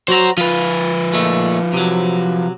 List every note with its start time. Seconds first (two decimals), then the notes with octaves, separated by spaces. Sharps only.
0.08 F#3 F#4 C5 A#5
0.38 F3 F4 B4
1.13 A#2 G#3 A3
1.73 C3 F#3